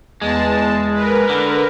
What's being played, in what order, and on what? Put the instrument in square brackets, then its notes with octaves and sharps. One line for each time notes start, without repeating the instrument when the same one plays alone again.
[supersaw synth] E2 A5 [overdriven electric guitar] G#3
[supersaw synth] A#4 B4
[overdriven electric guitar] D3